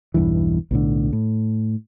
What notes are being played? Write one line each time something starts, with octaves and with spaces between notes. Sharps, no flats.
B1 E2 G2 E3
B1 A2 D3
A2